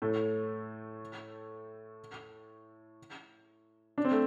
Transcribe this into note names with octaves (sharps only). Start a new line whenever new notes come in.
A2 A3
D4
C4
A3